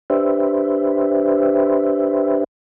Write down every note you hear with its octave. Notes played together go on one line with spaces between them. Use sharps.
D4 G4 B4 C5 E5